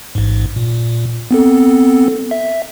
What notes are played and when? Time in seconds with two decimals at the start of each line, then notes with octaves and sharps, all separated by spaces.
0.15 A1 G#2
0.56 A#2
1.31 B3 C4 A4
2.31 E5